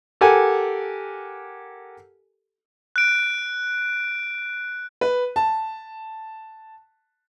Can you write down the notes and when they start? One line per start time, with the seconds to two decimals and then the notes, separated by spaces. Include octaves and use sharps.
0.21 G4 A4 A#4 F#5 G#5
2.96 F#6 D7
5.01 B4
5.36 A5